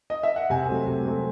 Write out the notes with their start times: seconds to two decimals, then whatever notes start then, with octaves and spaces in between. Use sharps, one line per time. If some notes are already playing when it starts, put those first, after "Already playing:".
0.10 D#5
0.23 E5
0.36 F#5
0.50 C3 G#5
0.69 F#3 A3 C4
0.87 C3
1.04 F#3 A3 C4